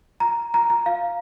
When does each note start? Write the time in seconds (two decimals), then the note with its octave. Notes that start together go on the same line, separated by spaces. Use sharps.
0.20 A#5
0.54 A#5
0.70 A#5
0.86 F5